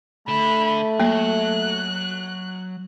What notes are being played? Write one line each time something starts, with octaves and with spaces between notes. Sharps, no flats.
D3 A3 A5 B5
F#3 A#3 F#6